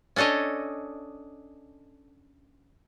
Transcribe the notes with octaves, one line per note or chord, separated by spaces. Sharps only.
C#4 D4 A4 C#5 D#5